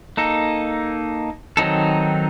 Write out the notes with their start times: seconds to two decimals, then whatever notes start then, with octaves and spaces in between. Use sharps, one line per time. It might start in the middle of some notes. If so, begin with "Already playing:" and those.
0.17 A#3 D#4 A4
1.57 D#3 F#3 C4 D#4 A4